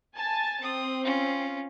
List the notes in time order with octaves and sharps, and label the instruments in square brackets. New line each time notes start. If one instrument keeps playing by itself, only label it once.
[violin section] G#5 A5 A6
[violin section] C4 [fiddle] D#6
[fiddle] C#4 F4